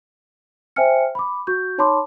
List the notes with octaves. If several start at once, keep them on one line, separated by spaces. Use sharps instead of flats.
C5 E5 G5 G#5 F6 C#7
B5 D6
F#4 C#6 G6
D#4 C#5 A5 B5 C6 D6